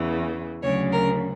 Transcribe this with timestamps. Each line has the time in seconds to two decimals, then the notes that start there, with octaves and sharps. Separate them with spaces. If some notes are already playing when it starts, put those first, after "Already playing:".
Already playing: E2 C#3 E3
0.62 D2 C#3 F#3 C#5
0.92 A#4